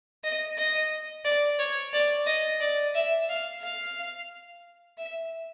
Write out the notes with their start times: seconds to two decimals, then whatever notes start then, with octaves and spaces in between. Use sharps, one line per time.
0.24 D#5
0.57 D#5
1.25 D5
1.59 C#5
1.93 D5
2.26 D#5
2.60 D5
2.95 E5
3.29 F5
3.62 F5
4.98 E5